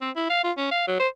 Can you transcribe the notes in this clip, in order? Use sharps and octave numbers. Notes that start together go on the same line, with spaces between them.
C4
E4
F5
F4
C#4
F5
F#3
C5